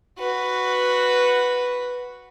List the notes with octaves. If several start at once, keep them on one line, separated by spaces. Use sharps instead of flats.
F#4 B4